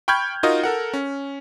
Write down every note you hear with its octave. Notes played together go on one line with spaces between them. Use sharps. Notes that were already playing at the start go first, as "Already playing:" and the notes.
G5 B5 C#6 F6 G6 G#6
D#4 F4 F#4 A#4 D#5
A4 A#4 F#5
C#4